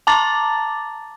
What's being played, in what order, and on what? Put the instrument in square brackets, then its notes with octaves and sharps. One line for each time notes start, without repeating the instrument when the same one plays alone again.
[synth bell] A5 A#5 D6 A6